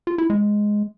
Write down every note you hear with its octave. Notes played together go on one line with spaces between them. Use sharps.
F4
E4
G#3